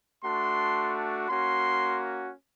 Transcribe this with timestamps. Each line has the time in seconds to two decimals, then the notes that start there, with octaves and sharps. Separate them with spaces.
0.24 A3 D4 F#4 C6
1.29 A#3 C#4 F#4 C6